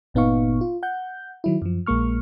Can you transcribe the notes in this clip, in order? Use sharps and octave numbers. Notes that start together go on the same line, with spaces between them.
G1 A#2 B3 D#4 F5 C#6
F4
F#5 G6
D#3 F#3 E4
F#2 F3
A#1 G#3 A#3 C#6 F6